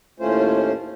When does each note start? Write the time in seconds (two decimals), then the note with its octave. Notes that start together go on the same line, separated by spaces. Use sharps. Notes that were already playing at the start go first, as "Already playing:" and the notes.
0.20 D#2 A2 A3 C#4 F4 C5